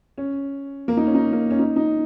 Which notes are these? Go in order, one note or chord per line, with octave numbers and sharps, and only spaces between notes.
C#4
A#3
D#4
C#4
D#4
A#3
C#4
D#4
D#4